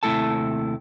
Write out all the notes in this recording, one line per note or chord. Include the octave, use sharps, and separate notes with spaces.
D#2 C3 A3 E4 A4 A5